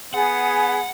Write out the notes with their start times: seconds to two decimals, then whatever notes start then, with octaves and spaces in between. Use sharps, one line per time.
0.14 B3 G#4 F#5